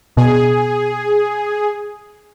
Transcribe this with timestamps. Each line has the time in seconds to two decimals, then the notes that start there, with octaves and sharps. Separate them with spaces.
0.17 B2 G#4